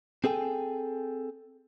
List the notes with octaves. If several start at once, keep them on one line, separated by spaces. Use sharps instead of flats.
C4 G#4 A4 G5 G#5